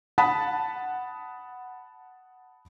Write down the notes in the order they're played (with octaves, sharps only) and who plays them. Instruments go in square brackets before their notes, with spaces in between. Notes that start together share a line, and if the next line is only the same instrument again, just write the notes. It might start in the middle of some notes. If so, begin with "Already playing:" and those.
[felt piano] F#5 A5 B5 D#6 B6